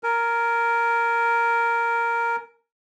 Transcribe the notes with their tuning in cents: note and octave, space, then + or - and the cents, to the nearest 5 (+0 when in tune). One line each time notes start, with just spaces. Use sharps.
A#4 +0 G#5 +25